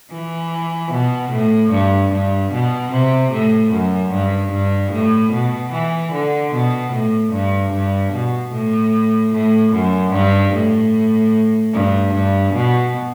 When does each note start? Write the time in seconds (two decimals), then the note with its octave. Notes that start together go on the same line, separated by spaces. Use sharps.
0.12 E3
0.92 B2
1.32 A2
1.72 G2
2.12 G2
2.52 B2
2.92 C3
3.32 A2
3.72 F#2
4.12 G2
4.52 G2
4.92 A2
5.32 B2
5.73 E3
6.13 D3
6.53 B2
6.93 A2
7.33 G2
7.73 G2
8.13 B2
8.53 A2
9.33 A2
9.73 F#2
10.13 G2
10.53 A2
11.74 G2
12.14 G2
12.54 B2